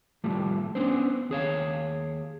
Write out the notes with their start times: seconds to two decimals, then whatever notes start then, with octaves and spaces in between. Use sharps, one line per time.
0.24 D#2 A2 F3 G3 A3
0.75 B3 C#4 D4 C5
1.30 D#2 G#4 C#5 F5